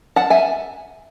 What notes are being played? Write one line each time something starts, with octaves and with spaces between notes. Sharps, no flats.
F#5 A5
E5 G#5